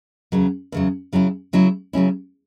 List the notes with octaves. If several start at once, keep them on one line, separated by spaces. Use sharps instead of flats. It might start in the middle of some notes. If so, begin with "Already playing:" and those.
E2 C#3 F#3
E2 C#3 F#3
C#3 F#3 C#4 E4
C#3 F#3 C#4 E4
C#3 F#3 C#4 E4